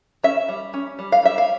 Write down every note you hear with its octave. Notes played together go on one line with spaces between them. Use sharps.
C#4 E5
G3
C#4
G3
F5
G3 E5
F5